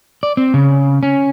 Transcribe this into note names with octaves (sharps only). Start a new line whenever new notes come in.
D5
C4
C#3
C#4